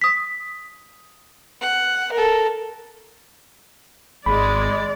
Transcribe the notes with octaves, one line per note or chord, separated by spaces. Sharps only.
D#6 B6
F#5
A4 A#4
G#1 G#3 D5 B5